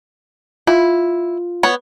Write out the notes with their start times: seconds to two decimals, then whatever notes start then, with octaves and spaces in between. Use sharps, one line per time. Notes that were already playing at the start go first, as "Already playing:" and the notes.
0.67 E4 F4
1.63 B3 C#5